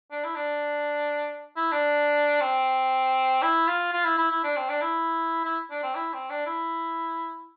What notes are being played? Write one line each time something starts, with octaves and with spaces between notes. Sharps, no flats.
D4
E4
D4
E4
D4
C4
E4
F4
F4
E4
E4
E4
D4
C4
D4
E4
E4
D4
C4
E4
C4
D4
E4